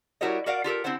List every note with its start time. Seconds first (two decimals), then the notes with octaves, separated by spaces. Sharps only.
0.21 G3 E4 F#4 A#4 C#5 D#5
0.46 F#4 A#4 D5 F5 F#5
0.64 F4 G4 A4 A#4
0.84 D3 C4 E4 F4 C5 F#5